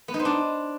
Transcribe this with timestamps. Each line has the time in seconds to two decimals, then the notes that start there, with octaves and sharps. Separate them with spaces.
0.08 B3
0.14 D#4
0.19 C5
0.25 D4